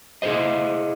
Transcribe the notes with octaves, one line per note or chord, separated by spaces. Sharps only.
E4 G#4 B4 C5 D#5